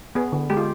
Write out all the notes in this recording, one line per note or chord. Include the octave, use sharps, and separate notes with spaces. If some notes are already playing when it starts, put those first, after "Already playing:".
B3 G#4
D3
G#3 G4
F4